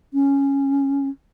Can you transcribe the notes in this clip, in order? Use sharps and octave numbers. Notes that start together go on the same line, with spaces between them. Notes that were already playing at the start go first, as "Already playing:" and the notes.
C#4